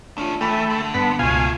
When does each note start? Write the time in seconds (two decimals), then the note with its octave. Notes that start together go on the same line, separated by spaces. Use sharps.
0.18 A3 C#4 D4 F4
0.41 E3 A3 G5 B5
0.70 D3
0.94 G2 B3 A5 B6
1.19 C#2 B2 A3 F4 F5 G#5